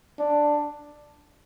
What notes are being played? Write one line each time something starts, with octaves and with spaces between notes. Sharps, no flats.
D4